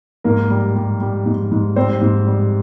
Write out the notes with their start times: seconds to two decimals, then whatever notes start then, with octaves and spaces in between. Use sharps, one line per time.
0.24 G#2 A#3 A#4
0.50 G3
0.75 G3
1.01 G3
1.26 G#2
1.51 G#2
1.76 G3 C4 C5
2.01 G#2
2.27 G3